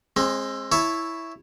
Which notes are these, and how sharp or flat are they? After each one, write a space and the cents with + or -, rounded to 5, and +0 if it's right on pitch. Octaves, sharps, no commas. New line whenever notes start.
G#3 +0 C4 +30
E4 +0 C#5 +0 A5 +0